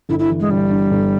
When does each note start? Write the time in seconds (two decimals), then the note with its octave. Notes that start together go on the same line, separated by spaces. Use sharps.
0.09 G1 E4
0.19 E4
0.30 E3
0.40 G#3
0.50 G1 G3
0.71 G2
0.91 G1